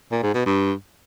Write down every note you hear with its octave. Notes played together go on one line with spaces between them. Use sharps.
A#2
G#2
B2
G2